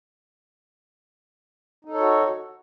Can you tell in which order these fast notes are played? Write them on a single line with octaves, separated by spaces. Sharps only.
D#4 A4 C#5 F#4